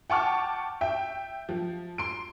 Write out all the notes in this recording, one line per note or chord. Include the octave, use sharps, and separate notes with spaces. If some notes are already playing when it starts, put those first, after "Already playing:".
F#5 G5 A5 C#6 D6 F6
E5 G5
F3
C6 D7